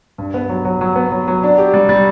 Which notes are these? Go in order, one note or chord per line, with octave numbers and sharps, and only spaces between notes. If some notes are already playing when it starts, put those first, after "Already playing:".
G2
B3
F#3
F#3
F#3
B3
F#3
F#3
D4
G4
G3
G3